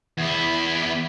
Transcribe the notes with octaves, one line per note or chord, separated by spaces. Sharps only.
E2 E4